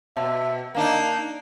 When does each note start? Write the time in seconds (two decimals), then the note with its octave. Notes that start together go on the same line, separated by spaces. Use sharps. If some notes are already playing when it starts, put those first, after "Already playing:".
0.17 B2 E5
0.75 A#3 D4 D#4 A#4